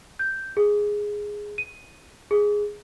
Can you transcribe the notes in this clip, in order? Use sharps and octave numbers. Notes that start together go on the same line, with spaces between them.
G6
G#4
D#7
G#4